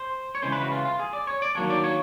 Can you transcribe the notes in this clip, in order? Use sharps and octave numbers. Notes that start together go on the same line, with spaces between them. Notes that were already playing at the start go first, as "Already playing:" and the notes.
Already playing: C5
C#5
C#3 E3 G#3 C5
B4
F#4
F4
F4
G#4
D5
C#5
D5
D#3 F#3 A#3 D4 C#5
D5
C#5